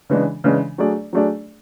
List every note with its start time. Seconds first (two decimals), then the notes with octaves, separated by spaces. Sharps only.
0.10 C#3 E3 G#3 D4
0.44 C#3 E3 G#3 D4
0.78 F#3 A3 D4 G#4 D5
1.13 F#3 A3 D4 G#4 D5